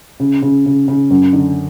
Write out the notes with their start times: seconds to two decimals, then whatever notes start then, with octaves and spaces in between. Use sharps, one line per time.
0.20 C#3
0.42 C#3
0.66 C#3
0.88 C#3
1.10 F#2
1.33 D3